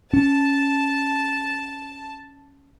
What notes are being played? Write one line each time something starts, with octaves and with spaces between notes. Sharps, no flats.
C#4 A5